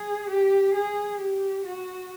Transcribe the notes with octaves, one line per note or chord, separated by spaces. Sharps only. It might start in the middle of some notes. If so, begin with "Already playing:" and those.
Already playing: G#4
G4
G#4
G4
F#4